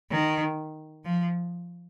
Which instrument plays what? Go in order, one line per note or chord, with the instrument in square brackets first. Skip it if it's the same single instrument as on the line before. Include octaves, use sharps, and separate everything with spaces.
[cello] D#3
F3